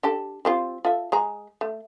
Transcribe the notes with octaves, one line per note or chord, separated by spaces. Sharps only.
D4 G4 A4
G3 C4 F4
F4 A4 E5
G#3 G#4 A#5
A3